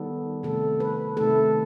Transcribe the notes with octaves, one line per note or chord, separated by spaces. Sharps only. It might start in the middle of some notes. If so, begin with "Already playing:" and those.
Already playing: D#3 G3 B3 A4
C3 D#3 A3 A4
B4
C3 D#3 A3 A4